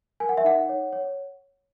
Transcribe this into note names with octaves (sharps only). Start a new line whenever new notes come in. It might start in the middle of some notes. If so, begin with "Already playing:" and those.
A#4 G#5
F#5
E5
D#4 F#5
C#5
C#5